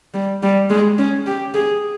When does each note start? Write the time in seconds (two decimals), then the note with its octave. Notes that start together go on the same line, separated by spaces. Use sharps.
0.14 G3
0.43 G3
0.70 G#3
0.98 C#4
1.27 G4
1.54 G#4